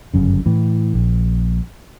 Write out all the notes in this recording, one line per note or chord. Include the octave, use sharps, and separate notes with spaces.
G1 F#2 C#3
A2 E3
A#1